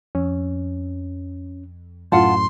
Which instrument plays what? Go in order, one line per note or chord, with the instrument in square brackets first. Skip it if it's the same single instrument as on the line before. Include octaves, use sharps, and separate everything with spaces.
[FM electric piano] F2 [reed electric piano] C#4
[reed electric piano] F#2 A2 [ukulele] F4 F#5 A5 [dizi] C6